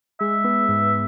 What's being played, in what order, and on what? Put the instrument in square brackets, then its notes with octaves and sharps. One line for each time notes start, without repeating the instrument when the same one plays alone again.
[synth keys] G#3 [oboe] E5
[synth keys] B3
G#2